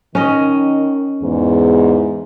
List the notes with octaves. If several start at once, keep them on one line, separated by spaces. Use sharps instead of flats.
D#3 C#4 D#5
E2 G#2